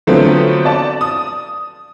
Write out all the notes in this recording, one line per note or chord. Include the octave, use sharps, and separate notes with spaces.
D3 F3 F#3 A3 B3 C4
D5 A5
D#6